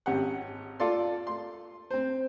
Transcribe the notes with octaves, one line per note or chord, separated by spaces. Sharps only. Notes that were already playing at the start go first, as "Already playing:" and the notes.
G#1 C#4 G4 F#5
F4 A4 D5 C6
C6
C4 C5